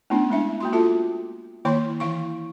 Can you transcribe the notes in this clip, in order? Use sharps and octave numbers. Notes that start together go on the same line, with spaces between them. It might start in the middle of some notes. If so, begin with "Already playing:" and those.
A3 B3 C#4 D4 E4
G#3 D4 E5
A#3 F#4 C6
F4 F#4 A4 E5 A5
D#3 A#3 E4 C#5 B5 C6
E3 E4 F5 C#6